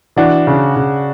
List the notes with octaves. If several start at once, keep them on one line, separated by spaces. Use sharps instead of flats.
E3 D4 F#4
C#3
C#3